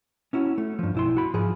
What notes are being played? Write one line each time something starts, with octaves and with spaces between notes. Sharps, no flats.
C#4 E4 F#4
A3
G2 F3
B1 E4 C6
F#4 B5
G#2 F3 G#4